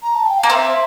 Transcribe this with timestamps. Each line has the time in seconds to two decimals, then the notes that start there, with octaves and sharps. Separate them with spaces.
0.03 A#5
0.15 A5
0.26 G5
0.38 F5
0.43 A#3
0.50 C4 F5
0.55 E5